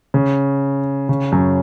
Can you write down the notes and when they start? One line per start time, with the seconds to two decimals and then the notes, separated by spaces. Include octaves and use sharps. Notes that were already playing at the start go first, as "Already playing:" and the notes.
0.14 C#3
1.09 C#3
1.32 F#2